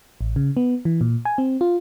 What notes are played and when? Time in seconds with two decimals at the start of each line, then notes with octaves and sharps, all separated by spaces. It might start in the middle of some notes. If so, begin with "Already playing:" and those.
0.21 A1
0.36 C#3
0.57 B3
0.85 E3
1.01 A#2
1.25 G#5
1.38 C4
1.61 F4